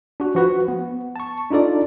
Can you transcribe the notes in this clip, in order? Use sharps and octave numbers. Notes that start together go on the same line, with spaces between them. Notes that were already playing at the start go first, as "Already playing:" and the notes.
D4 F#4
F3 F#4 B4
B3
A5 C#6
D4 D#4 F4 A4 D5